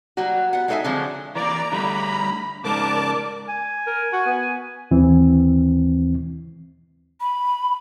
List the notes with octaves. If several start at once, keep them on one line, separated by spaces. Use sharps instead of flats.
F#3 G3 A#3 F#4
B3 F#5
G#3 D#4 A4 B4 E5 G#5
D3 F3 F#3 G#3 C4 F#4
E3 A#3 D5 A#5
D3 G3 A3 B5
G#2 C#3 G#3 A#4 D5 A5 D6
G#5
A#4
F#4
B3
D#2 E3 C4
B5